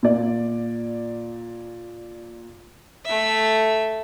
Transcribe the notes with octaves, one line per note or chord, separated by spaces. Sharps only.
A#2 D5
A3 E5